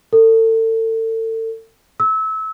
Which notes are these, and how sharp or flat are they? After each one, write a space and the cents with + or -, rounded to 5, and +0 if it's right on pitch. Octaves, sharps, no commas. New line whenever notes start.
A4 +35
E6 -25